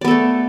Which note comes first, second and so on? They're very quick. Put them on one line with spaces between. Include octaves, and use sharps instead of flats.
D5 B3 A4 A3